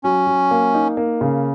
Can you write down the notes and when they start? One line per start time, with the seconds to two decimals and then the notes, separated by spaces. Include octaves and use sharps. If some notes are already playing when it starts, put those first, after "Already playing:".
0.03 F#3 C#4
0.27 F#3
0.51 A#3
0.74 D#4
0.97 A#3
1.21 C#3